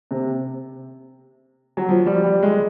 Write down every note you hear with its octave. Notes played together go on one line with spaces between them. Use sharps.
C3
F#3
F3
G3
G3
G#3